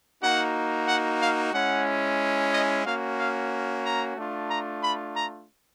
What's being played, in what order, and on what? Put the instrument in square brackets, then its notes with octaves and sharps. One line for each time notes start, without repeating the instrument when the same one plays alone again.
[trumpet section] A#3 D#4 F#4 F#5
F#5
F5
G#3 C#4 E4 F#5
D#5
A#3 C#4 F#4 F5
F5
A#5
A3 D4 F4
A#5
B5
A#5